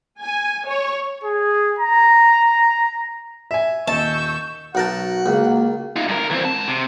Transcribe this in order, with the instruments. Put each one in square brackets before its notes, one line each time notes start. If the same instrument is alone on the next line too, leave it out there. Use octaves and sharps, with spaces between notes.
[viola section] G#5
C#5
[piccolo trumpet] G#4
A#5
[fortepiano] E5 G#5
[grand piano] D#1 D#2 D#5 [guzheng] A5 [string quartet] C#6 E6 G6
[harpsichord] B1 A#4 A5 [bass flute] F#4 [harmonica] F#5
[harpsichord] C#2 [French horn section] A#3
[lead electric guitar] D#4 F4
G2 A#4
E3 C4
G#2 A5
C3